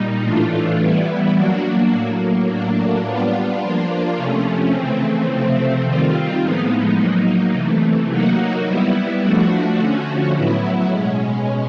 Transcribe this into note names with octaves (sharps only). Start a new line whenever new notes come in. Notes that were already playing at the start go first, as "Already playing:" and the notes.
Already playing: A#2 G3 D#4
A2 E3 A3 D4 F4
E3 G3 B3 E4
F#3 A#3 D4 F#4
A2 F#3 A#3
A2 F#3 A#3 D4
G3 B3 D4 F4
F3 A#3 D4 F4
C3 F3 A3 C#4
C#3 E3 A3 C4
C3 F3 A3 C4
D#3 G3 C4 F4
A2 F3 G#3 B3 D#4
F#3 A#3 D#4
C3 E3 A3
F#3 A#3 D#4 F#4
G3 B3 E4
F3 A3 D4 F#4
D3 F3 A3 C#4 F#4
A2 F#3 B3 E4
B2 G#3 C#4